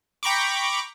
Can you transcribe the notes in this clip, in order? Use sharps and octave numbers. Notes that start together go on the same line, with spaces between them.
G5 A#5 B5 C#6 D6